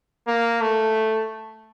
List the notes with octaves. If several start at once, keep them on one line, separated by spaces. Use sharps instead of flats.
A#3
A3